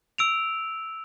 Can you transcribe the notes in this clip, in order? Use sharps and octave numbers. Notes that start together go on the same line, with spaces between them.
E6 D7 F7